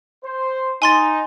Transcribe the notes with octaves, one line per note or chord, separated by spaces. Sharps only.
C5
D#4 G#5 C6 A6